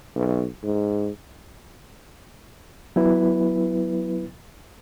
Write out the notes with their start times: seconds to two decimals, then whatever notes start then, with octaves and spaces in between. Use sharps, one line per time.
0.16 B1
0.64 G#2
2.96 F#3 B3 E4 B4